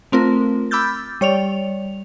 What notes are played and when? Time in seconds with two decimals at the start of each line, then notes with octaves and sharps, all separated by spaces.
0.12 A3 C4 F4 A#4
0.71 B5 D6 E6 F6 G6 A6
1.21 G3 C#5 D5 F7